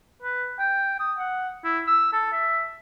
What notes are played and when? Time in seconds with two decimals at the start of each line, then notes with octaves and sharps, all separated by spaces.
0.22 B4
0.59 G5
0.99 D#6
1.18 F#5
1.64 E4
1.87 E6
2.13 A4
2.32 E5